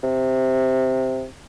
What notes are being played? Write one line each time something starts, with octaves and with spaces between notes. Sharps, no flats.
C3